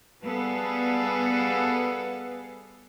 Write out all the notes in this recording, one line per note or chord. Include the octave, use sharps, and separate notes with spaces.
G3 B3 G#4 A4 B4 F5